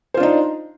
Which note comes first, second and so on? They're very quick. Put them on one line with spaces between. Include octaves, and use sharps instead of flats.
C5 F4 D4 D#4